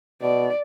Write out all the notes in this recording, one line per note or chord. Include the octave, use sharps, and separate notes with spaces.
B2 D5